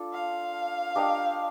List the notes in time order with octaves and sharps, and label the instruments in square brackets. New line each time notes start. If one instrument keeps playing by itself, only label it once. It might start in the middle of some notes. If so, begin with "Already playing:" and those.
Already playing: [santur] D4 F4 A4
[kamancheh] F5
[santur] D4 G4 A#4 D#5